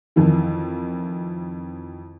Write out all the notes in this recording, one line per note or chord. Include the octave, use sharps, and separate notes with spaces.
F2 D#3 E3